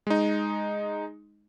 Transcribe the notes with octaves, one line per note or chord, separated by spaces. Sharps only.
G#3 D#4